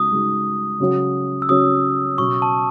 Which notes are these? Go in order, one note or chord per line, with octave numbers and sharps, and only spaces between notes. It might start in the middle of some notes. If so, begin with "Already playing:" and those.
Already playing: C#3 G#3 D#4 F#4 D#6
C#3 G#3 D#4 F#4
C#3 F#3 C#4 F#4
E6
C#3 F#3 C#4 F#4 D#6
B2 F#3 C#4 C#6
A5